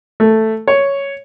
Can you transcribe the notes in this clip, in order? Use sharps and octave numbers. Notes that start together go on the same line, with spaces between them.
A3
C#5